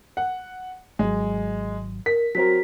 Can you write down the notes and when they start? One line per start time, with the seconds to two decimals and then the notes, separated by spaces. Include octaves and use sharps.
0.17 F#5
0.99 G#1 F#3 G#3
2.06 A#4 B6
2.35 F#3 C4 F#4 A#4 B6